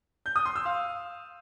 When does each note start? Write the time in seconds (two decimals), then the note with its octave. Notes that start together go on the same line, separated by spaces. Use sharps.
0.26 G6
0.36 D#6
0.46 C6
0.56 E6
0.65 F5